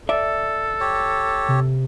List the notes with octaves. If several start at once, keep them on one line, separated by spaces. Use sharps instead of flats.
A4 D5 E5
G4 C#5
C3